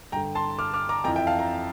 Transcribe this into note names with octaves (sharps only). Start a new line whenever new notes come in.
G2 D3 G5 A#5
A5 C6
D6 F6
D6 F6
A#5 D6
F2 E3 G5 A#5
E5 G5
F5 A5
G5 A#5